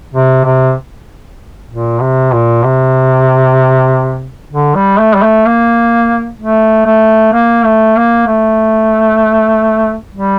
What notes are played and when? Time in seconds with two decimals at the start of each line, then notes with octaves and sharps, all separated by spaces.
0.14 C3
0.44 C3
1.70 A#2
2.01 C3
2.32 A#2
2.64 C3
4.51 D3
4.75 G3
4.99 A3
5.15 G3
5.22 A3
5.46 A#3
6.39 A3
6.86 A3
7.33 A#3
7.64 A3
7.96 A#3
8.27 A3
10.15 G3